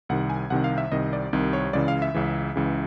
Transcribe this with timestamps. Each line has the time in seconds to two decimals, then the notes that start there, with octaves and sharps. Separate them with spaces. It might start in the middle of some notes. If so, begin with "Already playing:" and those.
0.09 C2 C3 D#3 F#5
0.30 G#5
0.50 C2 C3 D#3 F#5
0.64 F5
0.78 E5
0.92 C2 C3 D#3 D#5
1.13 D5
1.33 C2 C3 D#3
1.53 C#5
1.73 C#2 C#3 E3 D5
1.88 F5
2.02 E5
2.14 C#2 C#3 E3
2.56 C#2 C#3 E3